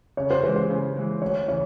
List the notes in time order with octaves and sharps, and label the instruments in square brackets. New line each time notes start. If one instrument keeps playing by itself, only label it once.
[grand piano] C#3 [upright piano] C#5
[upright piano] C5
[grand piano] E3 G#3 [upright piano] B4
[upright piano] C5
[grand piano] C#3
E3 G#3
[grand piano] D2 [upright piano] C#5
[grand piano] C#3 E3 [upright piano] C#5